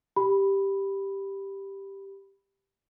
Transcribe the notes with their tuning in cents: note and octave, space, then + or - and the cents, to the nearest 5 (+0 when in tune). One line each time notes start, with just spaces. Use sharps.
G4 +0 B5 +0